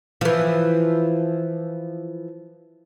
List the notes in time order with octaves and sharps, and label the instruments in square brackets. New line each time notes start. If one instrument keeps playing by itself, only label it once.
[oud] E3 F3